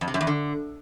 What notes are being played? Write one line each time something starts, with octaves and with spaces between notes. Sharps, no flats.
F2
C3
F#2
E2
D3